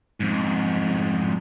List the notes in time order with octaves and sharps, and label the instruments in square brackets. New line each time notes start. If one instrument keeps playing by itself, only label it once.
[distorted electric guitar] F2 G#2